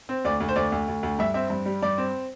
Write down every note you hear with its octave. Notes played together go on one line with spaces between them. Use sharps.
C4
D2 D5
D2
C5
D2 D5
D2
D2
D2
G2 E5
C4 E5
G2
G3
G2 D5
C4